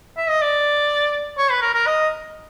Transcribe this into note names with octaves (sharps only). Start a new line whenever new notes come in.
E5
D#5
D5
C#5
B4
A#4
A#4
D#5